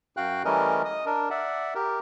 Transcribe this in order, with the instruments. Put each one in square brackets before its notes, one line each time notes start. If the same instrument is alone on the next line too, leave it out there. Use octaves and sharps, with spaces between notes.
[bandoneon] F#2 F#4 F5 G5 F#6
E3 G3 A3 C#4 A#4 D#5
D#5 D#6
D4 A#4
D5 E5 F#5
G4 A#4